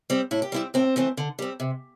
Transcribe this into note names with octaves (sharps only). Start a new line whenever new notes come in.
G3 C4
A2 E4
G4
G3 C4 E4
A2 C4
E3 A3 C4
D3
G3 C4
C3